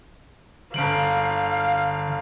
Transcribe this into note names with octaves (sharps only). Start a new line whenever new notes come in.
G1 D3 F5 D7 F#7